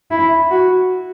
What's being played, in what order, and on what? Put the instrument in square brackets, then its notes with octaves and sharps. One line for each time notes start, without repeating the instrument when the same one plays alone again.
[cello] E4
F#4